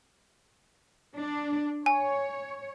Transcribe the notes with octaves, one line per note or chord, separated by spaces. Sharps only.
D4
C#5 G#5